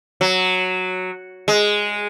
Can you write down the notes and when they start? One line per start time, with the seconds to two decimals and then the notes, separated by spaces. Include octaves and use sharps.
0.21 F#3
1.48 G#3